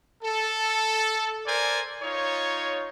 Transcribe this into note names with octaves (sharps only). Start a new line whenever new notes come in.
A4
A#4 C5 D5 G#5
D#4 F4 C#5